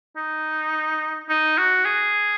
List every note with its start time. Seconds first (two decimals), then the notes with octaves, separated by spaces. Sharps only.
0.16 D#4
1.29 D#4
1.58 F#4
1.85 G#4